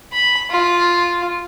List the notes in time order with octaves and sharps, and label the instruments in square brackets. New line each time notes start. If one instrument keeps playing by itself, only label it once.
[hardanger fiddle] B5
F4